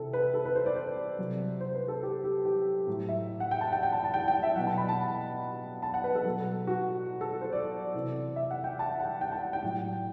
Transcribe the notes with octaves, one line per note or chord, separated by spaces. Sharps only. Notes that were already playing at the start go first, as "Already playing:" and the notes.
Already playing: C3 E3 A4
B4
A4
B4
C5
D5
C5
C3 F#3
C5
B4
A4
G4
G4
G4
A2 F#3
E5
F#5
G5
A5
G5
G5
A5
A5
G5
G5
E5
B2 F#3 F#5
A5
B5
A5
A5
F#5
B4
A4
B2 F#3
F#4
A4
C5
D5
C3 E3
E5
F#5
G5
A5
F#5
G5
A5
G5
A2 F#3